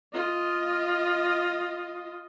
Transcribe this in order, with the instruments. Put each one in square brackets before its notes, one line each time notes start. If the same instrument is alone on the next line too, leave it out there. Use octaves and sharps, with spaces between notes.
[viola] F4 D#5